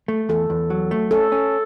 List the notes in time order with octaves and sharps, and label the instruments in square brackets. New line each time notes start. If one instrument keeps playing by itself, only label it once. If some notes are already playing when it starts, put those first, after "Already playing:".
[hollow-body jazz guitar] A3
[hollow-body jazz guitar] E2 [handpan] A4
[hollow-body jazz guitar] E2
F#3
A3
[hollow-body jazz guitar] C#4 [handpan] A4
[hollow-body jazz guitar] C#4